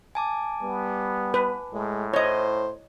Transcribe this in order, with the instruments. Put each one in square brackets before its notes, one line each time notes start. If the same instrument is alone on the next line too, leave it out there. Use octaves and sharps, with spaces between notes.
[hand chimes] G#5 A5 D6
[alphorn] G3 [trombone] B3
[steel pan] B4
[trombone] A2 [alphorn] G#3
[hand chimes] E4 [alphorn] C5 [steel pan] C#5 D#5